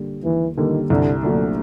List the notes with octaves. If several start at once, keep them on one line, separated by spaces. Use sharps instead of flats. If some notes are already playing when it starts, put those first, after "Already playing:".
Already playing: D3 G3 A#3
D#2 E3
D3 D#3 G3 A#3
C2 D3
A#2 D3 F#3 A3 D4